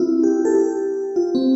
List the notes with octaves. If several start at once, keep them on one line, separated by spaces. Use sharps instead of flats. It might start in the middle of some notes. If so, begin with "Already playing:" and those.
Already playing: C4 E4 F4
G4
A4
G4
F4
C4